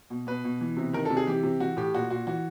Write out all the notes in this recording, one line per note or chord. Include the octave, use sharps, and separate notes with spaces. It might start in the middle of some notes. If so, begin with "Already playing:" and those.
B2
B2 B4
B2
E3
C3
D#3 A#4
C3 A4
G#4
E3 G4
C3
E3 F#4
A2 G4
A#2 F#4
A#2 F#4
E3 F#4